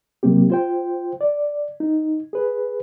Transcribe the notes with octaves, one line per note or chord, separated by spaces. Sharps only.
C3 F#3 A#3 C4 G4
F4 C5 G5
D5
D#4
G#4 B4